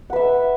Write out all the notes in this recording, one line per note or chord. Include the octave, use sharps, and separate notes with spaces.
B4 E5 F#5